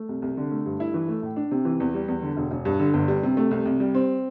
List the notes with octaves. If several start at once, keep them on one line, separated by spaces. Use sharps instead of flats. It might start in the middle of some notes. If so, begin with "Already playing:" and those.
Already playing: A3
C2
C2
D3
A3
G2
E4
E3
A3
A2
D4
C3
E3
E2
G3
E2
D3
E1
E1
G2
D3
G1
G3
C3
A3
C2
C2
G3
C4